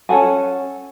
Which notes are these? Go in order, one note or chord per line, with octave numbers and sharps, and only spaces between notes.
C#4 A4 F#5 G#5